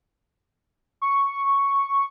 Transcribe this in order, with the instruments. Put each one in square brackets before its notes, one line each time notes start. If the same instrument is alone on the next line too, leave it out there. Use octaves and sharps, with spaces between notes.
[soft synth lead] C#6